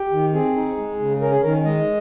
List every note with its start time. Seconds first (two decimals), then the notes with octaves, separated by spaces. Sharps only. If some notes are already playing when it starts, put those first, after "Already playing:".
Already playing: G4
0.12 D#3
0.33 C4 G#4
0.56 D#4
0.77 G#3
0.99 C#3
1.21 C#4 A#4
1.32 G#4
1.43 D#3 A#4
1.65 G#3 D#5